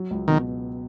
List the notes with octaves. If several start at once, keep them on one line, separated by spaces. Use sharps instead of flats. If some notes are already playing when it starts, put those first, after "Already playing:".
Already playing: F#3
C#2
B2 D#3